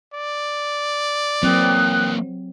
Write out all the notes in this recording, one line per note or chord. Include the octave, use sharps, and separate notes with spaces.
D5
E3 F#3 A#3 C4 G5 D#6 F#6